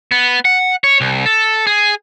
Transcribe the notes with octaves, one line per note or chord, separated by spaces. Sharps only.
B3
F#5
C#5
C2
A4
G#4